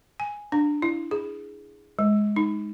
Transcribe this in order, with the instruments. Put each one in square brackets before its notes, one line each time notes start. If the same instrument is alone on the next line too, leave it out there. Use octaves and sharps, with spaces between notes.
[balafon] G#5
D4
E4
G#4
G#3
D#4